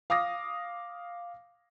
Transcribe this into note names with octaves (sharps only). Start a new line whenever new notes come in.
F5 D6 D#6 A#6